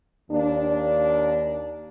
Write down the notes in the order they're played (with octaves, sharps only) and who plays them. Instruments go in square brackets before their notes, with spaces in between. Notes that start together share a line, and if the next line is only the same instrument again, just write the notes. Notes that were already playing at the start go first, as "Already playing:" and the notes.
[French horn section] D#2 A#3 D4